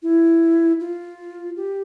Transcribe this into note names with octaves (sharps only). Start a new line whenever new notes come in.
E4
F4
G4